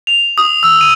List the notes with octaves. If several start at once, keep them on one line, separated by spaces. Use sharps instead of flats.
F7
D#6
E6
D#7